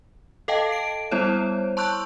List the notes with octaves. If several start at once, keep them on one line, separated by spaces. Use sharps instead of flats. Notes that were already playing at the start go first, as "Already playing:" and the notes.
A4 D#5 F5 G5 A5
D7
G3 B3 E4 C5 C#5
A5 C6 C#6 E6 F#6 G6